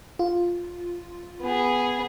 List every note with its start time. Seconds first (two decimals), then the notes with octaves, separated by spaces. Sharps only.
0.19 F4
1.41 B3 G#4